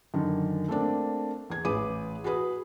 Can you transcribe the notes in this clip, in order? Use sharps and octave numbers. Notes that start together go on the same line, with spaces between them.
F#2 D3 D#3
A3 A#3 C4 D4
E2 G#6
A1 G#4 B4 D6 D#7
F#4 G#4 B4 D#6